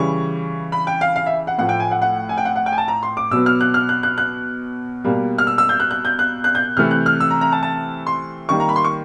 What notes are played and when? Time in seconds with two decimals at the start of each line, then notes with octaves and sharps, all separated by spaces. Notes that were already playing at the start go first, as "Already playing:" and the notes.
Already playing: C#3 E3 G3 C#6
0.72 B5
0.87 G5
1.01 F5
1.16 F5
1.26 E5
1.47 F#5
1.58 A2 F3 A3 F#5
1.69 G5
1.80 G#5
1.91 F#5
2.02 F#5
2.29 G#5
2.38 G5
2.45 F#5
2.56 F#5
2.66 G5
2.72 G#5
2.78 A5
2.88 A#5
3.03 C6
3.17 D6
3.31 B2 F#3 B3 E6
3.46 F6
3.61 F#6
3.74 F6
3.89 F#6
4.03 F#6
4.18 F#6
5.04 B2 G3 A#3
5.38 F6
5.47 E6
5.58 E6
5.69 G6
5.80 F#6
5.91 F#6
6.05 G6
6.19 F#6
6.44 F#6
6.55 G6
6.77 C3 E3 A3 F6
6.91 F#6
7.06 F6
7.20 E6
7.30 A#5
7.41 A#5
7.52 A5
7.63 A5
8.07 C6
8.49 D#3 G3 A#3 C#6
8.60 A#5
8.69 B5
8.76 C6
8.84 C#6